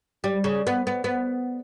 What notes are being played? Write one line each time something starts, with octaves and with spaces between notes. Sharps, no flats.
G3
C#3
B3
B3
B3